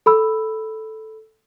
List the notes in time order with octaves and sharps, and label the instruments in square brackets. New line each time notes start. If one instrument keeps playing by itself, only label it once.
[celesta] A4 B5 E6